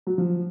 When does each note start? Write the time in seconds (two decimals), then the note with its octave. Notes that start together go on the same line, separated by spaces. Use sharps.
0.07 F#3
0.18 F3